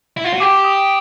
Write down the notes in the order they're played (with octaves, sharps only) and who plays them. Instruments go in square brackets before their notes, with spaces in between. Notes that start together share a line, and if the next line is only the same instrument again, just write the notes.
[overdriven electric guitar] E4
F4
F#4
[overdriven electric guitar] G4 [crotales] D6
[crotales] D#6